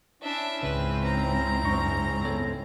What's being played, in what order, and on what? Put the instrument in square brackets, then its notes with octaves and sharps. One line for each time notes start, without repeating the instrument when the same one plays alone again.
[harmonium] C#4 E4 [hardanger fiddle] D4 E5
[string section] C#2 G#2 C4 [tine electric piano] C#3 [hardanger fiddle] B4
[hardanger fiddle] A#5
[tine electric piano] F#2 D4 C#6
B3 A4 C#5